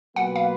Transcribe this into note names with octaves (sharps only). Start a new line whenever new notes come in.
B2 F#3 A#3 F4 B4 F#5
F5